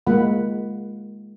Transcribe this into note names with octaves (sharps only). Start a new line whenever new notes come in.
G#3 A#3 F4 F#5 B5